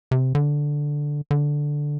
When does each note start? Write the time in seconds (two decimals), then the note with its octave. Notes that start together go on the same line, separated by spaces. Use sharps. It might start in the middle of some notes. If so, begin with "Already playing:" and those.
0.11 C3
0.35 D3
1.31 D3